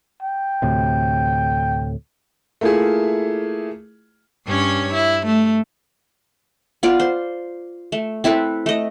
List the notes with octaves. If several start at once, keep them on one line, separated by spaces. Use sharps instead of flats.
G5
D2 A2 C3
A3 A#3 E4 F4 G#4
G2 C#4 C#5
E4
A3
B3 F4 D5
C5
A3
C4 E4 A4 B4
A3 D#5